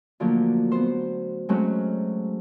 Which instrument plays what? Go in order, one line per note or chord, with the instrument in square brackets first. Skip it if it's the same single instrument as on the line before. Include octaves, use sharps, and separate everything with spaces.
[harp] D3 F3 F#3 A3 A#3
B3 C5
F#3 G#3 A3 C4 C#4 F#4